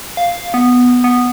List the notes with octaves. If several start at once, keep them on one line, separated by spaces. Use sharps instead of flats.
F5
B3
B3